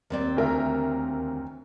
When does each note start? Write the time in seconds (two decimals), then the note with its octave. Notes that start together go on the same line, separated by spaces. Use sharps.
0.10 D#2 C4 D5
0.37 D2 A#4 E5